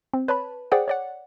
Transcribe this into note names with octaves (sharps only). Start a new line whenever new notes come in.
C4
B4 C#5 A5 B5
G#4 C5 D5 F#5 G5
C#5 D5 F#5